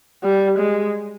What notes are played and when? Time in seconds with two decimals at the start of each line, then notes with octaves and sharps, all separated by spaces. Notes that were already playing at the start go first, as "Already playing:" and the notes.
0.23 G3
0.59 G#3